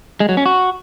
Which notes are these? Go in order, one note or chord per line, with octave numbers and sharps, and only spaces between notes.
G#3
F#3
C#4
F#4